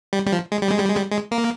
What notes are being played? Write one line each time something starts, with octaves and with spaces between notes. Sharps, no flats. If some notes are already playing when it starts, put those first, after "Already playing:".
G3
G3
F3
G#3
G3
G#3
G3
G#3
G3
G#3
A#3